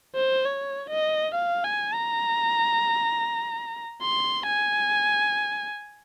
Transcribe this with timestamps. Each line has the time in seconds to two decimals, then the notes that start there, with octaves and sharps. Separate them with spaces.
0.16 C5
0.45 C#5
0.90 D#5
1.35 F5
1.64 G#5
1.94 A#5
4.02 C6
4.47 G#5